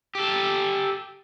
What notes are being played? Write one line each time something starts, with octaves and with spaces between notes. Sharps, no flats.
G4 A4